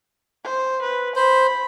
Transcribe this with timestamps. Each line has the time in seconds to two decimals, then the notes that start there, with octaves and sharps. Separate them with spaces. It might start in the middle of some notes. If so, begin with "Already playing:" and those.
0.44 C5
0.82 B4
1.16 C5 B5